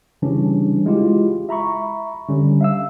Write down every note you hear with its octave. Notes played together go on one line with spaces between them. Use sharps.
C#3 E3 G3 C#4 D4
G#3 E4 F4 G4
E5 A#5 B5 C#6
D3 G3 C#4
E5 F5 E6